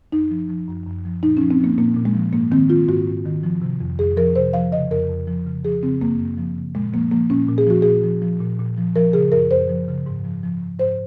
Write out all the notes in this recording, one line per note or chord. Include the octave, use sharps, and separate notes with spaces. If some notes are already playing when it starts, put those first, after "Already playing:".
F#2 D#4
F3
F3
F#2
F#2
F3
A#2 D#4
F3 C#4
C4
F3 A#3
A#2 A#3
A#2
G#3
F3
G#2 A#3
D#3 C4
D#3 F4
G#2 F#4
G#2
D#3
F3
C3
F2
F2 G#4
F3 A#4
C3 C5
F3 F5
C#3 D#5
F2 A#4
F2
F3
C#3
F3 G#4
C#3 C4
F#2 A#3
F#2
F3
C#3
A#2 G#3
F3 A#3
F3 A#3
A#2 C#4
A#2
G#4
F3 F#4
A#2 G#4
F3
F3
A#2
A#2
F3
F3 A#4
C#3 G#4
F#2 A#4
F#2 C5
F3
C#3
G#2
F3
F3
G#2
G#2 C5